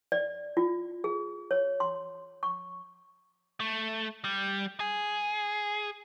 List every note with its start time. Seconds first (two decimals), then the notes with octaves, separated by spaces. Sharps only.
0.12 D5
0.57 F4
1.04 G#4
1.51 C#5
1.80 C6
2.43 C#6
3.60 A3
4.25 G3
4.80 G#4